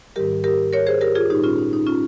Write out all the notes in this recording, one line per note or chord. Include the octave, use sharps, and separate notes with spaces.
G#2 D#3 G3 G4 A#4
G4 A#4
A#4 C#5
G#4 C5
G4 A#4
F4 G#4
A#2 G#3 D#4 G4
C#4 F4
D#4
D#4
C#4 F4